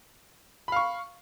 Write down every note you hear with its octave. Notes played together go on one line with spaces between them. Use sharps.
F5 B5 C#6